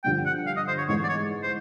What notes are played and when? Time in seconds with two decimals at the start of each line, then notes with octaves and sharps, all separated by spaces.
0.04 G2 D3 F3 G5
0.26 F#5
0.47 F5
0.57 D#5
0.68 C5
0.78 C#5
0.88 G#2 E3 G#3 C#5
1.04 D5
1.09 C#5
1.43 C5